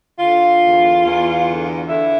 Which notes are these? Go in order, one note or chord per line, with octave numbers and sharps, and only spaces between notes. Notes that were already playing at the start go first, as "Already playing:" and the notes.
D3 F4
E2
E2
D3
D3 E4